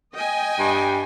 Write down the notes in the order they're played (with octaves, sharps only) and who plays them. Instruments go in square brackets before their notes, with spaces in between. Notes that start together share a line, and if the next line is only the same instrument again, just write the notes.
[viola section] D#5 G5 G#5
[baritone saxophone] G2